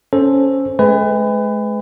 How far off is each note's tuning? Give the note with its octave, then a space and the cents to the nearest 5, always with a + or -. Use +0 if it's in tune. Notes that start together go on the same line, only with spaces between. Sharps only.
C#4 +0 A4 +0 C5 +0
G#3 +35 B4 +30 G#5 -45